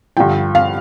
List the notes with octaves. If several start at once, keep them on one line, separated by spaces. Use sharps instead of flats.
G2 D3 F3 G5
F5